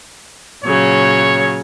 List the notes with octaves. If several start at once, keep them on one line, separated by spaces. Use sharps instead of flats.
A#2 C#3 F#3 C#5